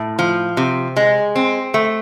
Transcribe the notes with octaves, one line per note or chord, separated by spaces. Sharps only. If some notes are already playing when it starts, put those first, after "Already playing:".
Already playing: A2
F3
C3
G#3
C4
A3